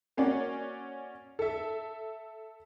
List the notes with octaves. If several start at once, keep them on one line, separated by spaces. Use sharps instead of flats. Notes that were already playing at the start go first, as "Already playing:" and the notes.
A#3 C#4 F#4 D5
A4 E5